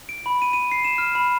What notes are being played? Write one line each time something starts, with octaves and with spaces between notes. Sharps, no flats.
D7
B5
D#7
D#7
C7
E7
F6
B5